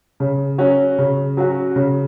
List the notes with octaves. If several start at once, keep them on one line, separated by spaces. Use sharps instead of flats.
C#3
F#3 C#4 F#4
C#3
F#3 C#4 F#4
C#3